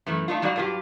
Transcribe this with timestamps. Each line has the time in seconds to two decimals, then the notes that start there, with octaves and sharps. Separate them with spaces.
0.06 F#2 E3 A3
0.28 A3 D4 D#4 F4
0.42 F#3 G3 D#4 F#4 D5 F5
0.56 G2 F#3 A3 A#3 F4 G4